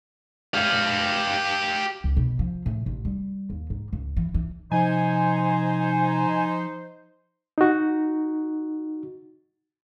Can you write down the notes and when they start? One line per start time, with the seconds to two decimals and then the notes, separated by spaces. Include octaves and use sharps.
0.54 G4 F5
2.04 C#2
2.17 B2
2.39 F3
2.66 A2
2.86 A1
3.05 G3
3.50 D#2
3.70 G#2
3.93 C#2
4.17 E3
4.34 E3
4.72 C3 F3 D#4 C5 G#5
7.58 D#4 F#4